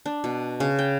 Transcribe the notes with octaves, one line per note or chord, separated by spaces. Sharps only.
D4
B2
C#3
G5